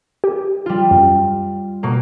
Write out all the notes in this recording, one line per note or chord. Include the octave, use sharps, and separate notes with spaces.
G4
G3 F4
F#2
B2 A#3